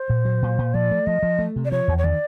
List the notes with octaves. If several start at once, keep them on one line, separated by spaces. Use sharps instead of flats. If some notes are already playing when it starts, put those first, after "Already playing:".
Already playing: C5
A#2
F#3
A#2
A#2
F3 D5
A3
F3 D#5
F3
A3
C3
D5
F3 C#5
E2
C#5
D#3 D5